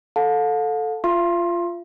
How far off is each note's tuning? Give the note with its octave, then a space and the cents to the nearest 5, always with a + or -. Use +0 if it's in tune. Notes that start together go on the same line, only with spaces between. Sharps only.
A4 +0 F5 +45 A5 +0
F4 -10 F5 -45 C6 +20